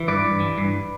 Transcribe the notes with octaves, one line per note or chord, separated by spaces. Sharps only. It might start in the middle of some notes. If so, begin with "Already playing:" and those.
Already playing: E3
G2 B4 D5
G2
E3
G2